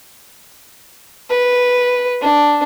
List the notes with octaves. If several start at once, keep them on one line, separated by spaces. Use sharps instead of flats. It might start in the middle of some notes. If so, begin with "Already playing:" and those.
B4
D4